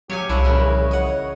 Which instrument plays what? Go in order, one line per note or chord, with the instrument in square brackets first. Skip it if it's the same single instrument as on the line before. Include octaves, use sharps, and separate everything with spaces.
[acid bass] F#3 [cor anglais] G4 [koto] C#5 F5 G#5
[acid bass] C2 [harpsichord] D4 [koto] E4 [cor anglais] C#5
[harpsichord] A#1 B4 [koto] C#3 E3 A#4
[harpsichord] D#5 F#5